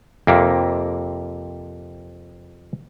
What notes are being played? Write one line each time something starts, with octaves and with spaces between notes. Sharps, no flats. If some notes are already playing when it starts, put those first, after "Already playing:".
F2 C3 A#3